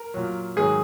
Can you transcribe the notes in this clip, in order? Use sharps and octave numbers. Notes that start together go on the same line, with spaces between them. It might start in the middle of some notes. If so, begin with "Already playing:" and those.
Already playing: A#4
A#2 F#3
G#2 D#3 F#3 G#4